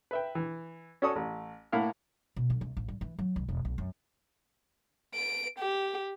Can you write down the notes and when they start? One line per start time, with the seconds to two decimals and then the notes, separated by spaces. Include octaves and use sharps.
0.11 B4 E5 G5
0.35 E3
1.02 C#4 F#4 A4 D5 C#6 D#6
1.16 A1
1.72 A2 A#3 E4 F5 F#5 F6
2.36 B2
2.50 D3
2.61 C2
2.77 A1
2.88 G2
3.01 E3
3.19 F#3
3.36 C2
3.48 E1
3.65 B1
3.78 F#2
5.14 D7
5.59 G4